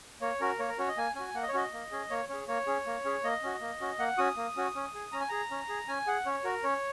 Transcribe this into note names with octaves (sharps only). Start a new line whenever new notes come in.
A#3 C#5
C#4 F#4 A#4
A#3 C#5
A#4
C#4 F#4 C#5
D#5
A#3 G#5
C#4 F#4 G#5
A#3 F#5
D#5
C#5
C#4 F#4 D#5
A#3
C#4 G#4
A#3 C#5
C#4 G#4 C#5
A#3 C#5
C#4 G#4
A#3
C#4 G#4
A#3 D#5
C#4 F#4
A#3
C#4 F#4
A#3 F#5
C#4 F#4 D#6
A#3
C#4 F#4
C#4
G#4
C#4 A#5
G#5
G#4 A#5
C#4
G#4
C#4 G#5
G#4 F#5
C#4 C#5
F#4 A#4
C#4 C#5